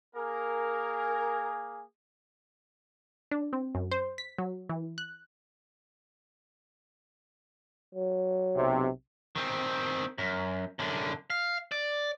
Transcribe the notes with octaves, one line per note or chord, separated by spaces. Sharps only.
A#3 G#4 A#4
D4
C4
F#2
C5
B6
F#3
E3
F#6
F#3
B1 C3
D#3 C4
F#2
F#2 D3
F5
D5